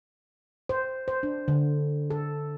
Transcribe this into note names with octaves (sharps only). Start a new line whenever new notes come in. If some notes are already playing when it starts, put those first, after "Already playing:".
C5
C5
D4
D3
A4